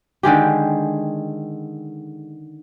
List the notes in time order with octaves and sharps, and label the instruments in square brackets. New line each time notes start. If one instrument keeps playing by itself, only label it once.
[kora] D3 D#3 G#3 G4